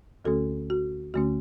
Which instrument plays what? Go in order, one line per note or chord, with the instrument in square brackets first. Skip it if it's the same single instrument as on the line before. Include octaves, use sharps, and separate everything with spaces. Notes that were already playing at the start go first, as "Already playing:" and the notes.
[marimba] D2 D3 A3 C#4 F#4 A4
F#4
D2 D3 A3 C#4 F#4